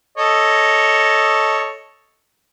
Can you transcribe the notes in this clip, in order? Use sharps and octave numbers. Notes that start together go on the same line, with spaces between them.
A4 C#5 D#5